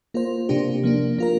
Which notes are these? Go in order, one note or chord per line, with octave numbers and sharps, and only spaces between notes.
A#3 F4 C5
C3 A#3 D4 G4
F3 A#3 D4
A#3 F4 A#4